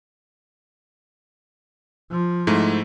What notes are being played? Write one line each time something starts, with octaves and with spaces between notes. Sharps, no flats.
F3
G#2 A3 E4